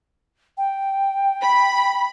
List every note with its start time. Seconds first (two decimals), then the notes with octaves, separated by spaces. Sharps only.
0.58 G5
1.42 B5